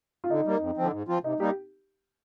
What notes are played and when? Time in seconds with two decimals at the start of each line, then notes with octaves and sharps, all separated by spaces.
0.24 F4
0.30 D3 D#4
0.46 G3 A#3
0.61 F2
0.77 D3 F3 C4
0.93 G#2
1.08 F3 C4 F4
1.24 C3 D#4
1.40 G3 A#3 D#4 G4